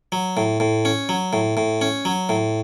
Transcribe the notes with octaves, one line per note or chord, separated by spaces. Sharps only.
F#3
A2
A2
C#4
F#3
A2
A2
C#4
F#3
A2